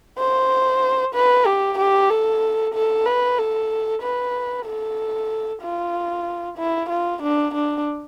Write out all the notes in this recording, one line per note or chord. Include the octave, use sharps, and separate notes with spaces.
C5
B4
G4
G4
A4
A4
B4
A4
B4
A4
F4
E4
F4
D4
D4